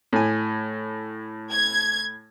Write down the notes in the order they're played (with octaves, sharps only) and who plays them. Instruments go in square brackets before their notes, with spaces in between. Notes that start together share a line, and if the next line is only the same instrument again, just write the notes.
[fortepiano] A2 G#5
[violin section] G#6